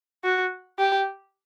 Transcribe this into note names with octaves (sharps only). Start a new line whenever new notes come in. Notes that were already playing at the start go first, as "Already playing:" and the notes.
F#4
G4